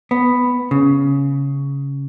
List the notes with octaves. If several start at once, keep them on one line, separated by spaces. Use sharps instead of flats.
B3
C#3